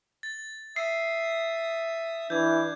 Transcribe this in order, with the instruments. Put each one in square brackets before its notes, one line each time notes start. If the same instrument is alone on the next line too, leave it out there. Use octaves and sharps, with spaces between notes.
[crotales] A6
[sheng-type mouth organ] E5 D#6 [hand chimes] C7
[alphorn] E3 [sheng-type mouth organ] D4 [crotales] G6 G#6